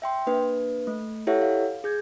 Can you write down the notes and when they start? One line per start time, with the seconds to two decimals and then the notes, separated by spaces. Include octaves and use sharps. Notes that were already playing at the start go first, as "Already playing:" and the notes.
0.02 E5 G5 C6
0.27 A#3 D4 B4
0.87 A3
1.27 E4 G4 A4 C#5 E5 F#5
1.42 F5
1.84 G#4 G6 G#6